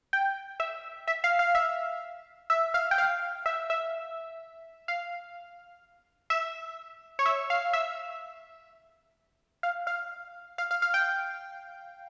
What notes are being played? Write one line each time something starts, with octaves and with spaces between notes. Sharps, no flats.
G5
E5
E5
F5
F5
E5
E5
F5
G5
F5
E5
E5
F5
E5
C#5
E5
F5
E5
F5
F5
F5
F5
F5
G5